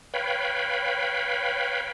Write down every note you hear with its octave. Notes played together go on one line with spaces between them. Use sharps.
B4 C#5 F5 G5 B5